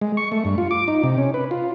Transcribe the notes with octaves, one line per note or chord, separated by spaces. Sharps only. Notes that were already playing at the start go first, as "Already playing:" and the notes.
G#3
C#6
A3
G2
F4
D6
D#4
C3
C#4
B4
F4